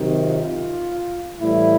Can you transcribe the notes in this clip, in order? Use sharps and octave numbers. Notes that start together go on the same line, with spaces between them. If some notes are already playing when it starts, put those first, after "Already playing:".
Already playing: C3 D#3 F#3
F4
A2 E3 G3 E4